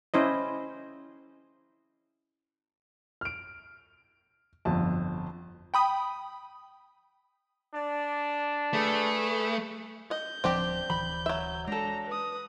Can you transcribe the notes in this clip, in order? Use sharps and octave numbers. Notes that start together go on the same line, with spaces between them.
C#4 E4 C5 D#5
F6 D7
G1 F2 A5
G5 B5 D#6
D4 D5
A3 G#4 B4
D#5 G6
D1 F3 C4 D4 G4
D1 E3 B5
F#3 E5
G#3 D4 A4 A#5
B4 D#6